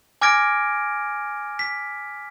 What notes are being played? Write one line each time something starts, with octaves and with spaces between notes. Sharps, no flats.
G#5 D6 F6 G#6 A#6 D7
B6